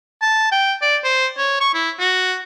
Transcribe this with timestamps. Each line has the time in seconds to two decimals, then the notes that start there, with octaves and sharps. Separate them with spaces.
0.22 A5
0.52 G5
0.82 D5
1.04 C5
1.37 C#5
1.61 C#6
1.74 E4
1.99 F#4